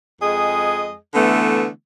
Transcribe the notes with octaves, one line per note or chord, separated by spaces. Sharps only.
F2 G#3 G#4 D#5
D3 E3 A3 B3